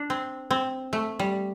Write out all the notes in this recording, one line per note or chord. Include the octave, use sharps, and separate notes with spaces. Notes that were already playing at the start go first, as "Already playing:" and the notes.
Already playing: D4
C4
C4
A3
G3